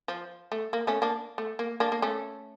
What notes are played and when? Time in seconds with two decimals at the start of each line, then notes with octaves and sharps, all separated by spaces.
0.08 F3
0.52 A3
0.73 A#3
0.87 A3 C#4
1.02 A#3 D4
1.38 A3
1.59 A#3
1.80 A#3 D4
1.92 A#3
2.02 A3 C#4